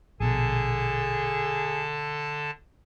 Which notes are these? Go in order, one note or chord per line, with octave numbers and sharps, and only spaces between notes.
A#1 B2 D3 G#4 A4 A5